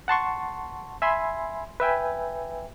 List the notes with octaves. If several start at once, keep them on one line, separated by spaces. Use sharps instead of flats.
F#5 A5 C6 C#6
E5 G#5 B5 C6
B4 E5 G5 G#5